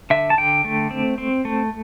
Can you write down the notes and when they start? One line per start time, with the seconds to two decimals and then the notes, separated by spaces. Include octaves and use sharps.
0.10 D3 E5
0.30 A5
0.38 D3 G5
0.64 A3
0.91 C4
1.18 C4
1.45 A3